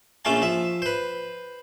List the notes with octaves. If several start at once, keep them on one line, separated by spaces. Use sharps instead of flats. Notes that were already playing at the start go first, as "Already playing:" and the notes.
A#1 A3 C#4 F4 A5
F3 E5
B4 C5